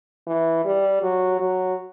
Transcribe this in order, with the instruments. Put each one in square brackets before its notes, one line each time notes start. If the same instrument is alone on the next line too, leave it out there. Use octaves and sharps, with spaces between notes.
[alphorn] E3
G3
F#3
F#3